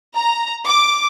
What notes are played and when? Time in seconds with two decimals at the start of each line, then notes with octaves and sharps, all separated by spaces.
0.15 A#5
0.67 D6